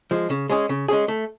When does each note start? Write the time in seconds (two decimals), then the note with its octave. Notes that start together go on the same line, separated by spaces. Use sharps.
0.11 F3 G#3
0.30 C#3
0.49 G#3 C#4 G#4
0.69 C#3
0.88 G#3 C#4 G#4
1.08 A3